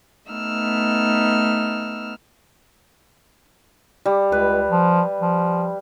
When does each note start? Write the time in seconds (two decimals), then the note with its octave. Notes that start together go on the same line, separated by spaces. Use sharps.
0.30 A3 B3 D#4 E6 F6
4.06 G3
4.32 C#2 B4
4.70 F3
5.20 F3